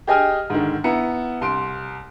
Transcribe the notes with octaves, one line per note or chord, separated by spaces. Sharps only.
G4 G#4 D#5 G5 G#5 F6
G#2 D3 D#3
B3 E4 A#5 C#7
C2 C6 D7